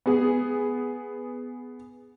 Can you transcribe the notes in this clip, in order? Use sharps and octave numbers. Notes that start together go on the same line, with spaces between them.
B3 G#4